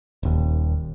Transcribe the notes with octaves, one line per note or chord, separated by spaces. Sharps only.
D#1 D#2